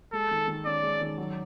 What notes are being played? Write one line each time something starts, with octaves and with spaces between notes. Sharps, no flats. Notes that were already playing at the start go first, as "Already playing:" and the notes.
G#3 A4
D#3
D#3
C#4 D5
G#3
D#3
F#3